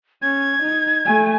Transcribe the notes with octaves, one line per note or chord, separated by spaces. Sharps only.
C#4 G#6
D#4
A3 G#5